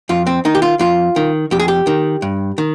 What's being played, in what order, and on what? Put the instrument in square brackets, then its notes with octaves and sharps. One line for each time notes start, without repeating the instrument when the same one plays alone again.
[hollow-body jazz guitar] F2 F4
C4
D#3 D#4
G4
F4
F2 F4
D#3
F2 G4
G#4
G4
D#3
G2
D#3